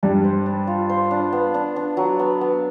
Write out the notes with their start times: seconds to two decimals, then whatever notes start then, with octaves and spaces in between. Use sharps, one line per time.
0.03 G2 G3 D4
0.24 C5
0.46 D4
0.67 F4
0.89 C5
1.11 D4
1.32 B3
1.54 D4
1.76 D4
1.97 F#3
2.19 B3
2.41 B3